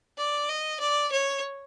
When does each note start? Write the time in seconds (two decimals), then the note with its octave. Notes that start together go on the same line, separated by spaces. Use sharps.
0.18 D5
0.49 D#5
0.80 D5
1.12 C#5